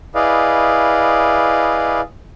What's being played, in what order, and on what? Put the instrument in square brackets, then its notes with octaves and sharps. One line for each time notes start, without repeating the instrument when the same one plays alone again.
[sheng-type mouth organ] E4 G#4 B4 D5 D#5 F5